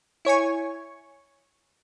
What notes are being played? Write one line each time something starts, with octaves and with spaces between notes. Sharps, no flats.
E4 C#5 G#5 C#6